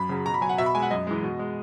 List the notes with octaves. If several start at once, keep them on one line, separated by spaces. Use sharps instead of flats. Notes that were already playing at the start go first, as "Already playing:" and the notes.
Already playing: F#2 B5
C#3 F#3
B2 A#5
B5
F#3 G#5
F#5
B2 E5
B5
G#3 G#5
F#5
F#2 D#5
E3 G#3
B2
G#3